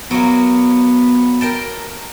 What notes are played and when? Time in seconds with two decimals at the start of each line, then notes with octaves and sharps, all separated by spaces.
0.11 F#3 A#3 B3
1.41 A#4 G5 A5